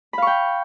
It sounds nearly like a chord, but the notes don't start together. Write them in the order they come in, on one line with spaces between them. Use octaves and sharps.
B5 F5 C#6 G5